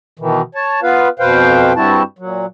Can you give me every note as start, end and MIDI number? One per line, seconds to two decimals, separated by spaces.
0.19 0.42 47
0.19 0.42 51
0.19 0.42 52
0.55 0.80 73
0.55 0.80 81
0.83 1.09 59
0.83 1.09 65
0.83 1.09 71
0.83 1.09 77
1.19 1.73 41
1.19 1.73 47
1.19 1.73 71
1.19 1.73 72
1.19 1.73 77
1.19 1.73 79
1.76 2.02 43
1.76 2.02 55
1.76 2.02 60
1.76 2.02 64
1.76 2.02 66
1.76 2.02 81
2.19 2.46 46
2.19 2.46 54